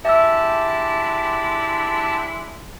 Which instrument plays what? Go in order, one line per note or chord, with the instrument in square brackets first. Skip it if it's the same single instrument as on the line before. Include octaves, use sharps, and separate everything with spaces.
[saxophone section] G#3 D4 E4 [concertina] G4 A5 [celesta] E5 E6